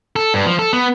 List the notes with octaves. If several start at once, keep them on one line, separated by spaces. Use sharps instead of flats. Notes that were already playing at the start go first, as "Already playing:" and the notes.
A4
G2
F3
A4
B3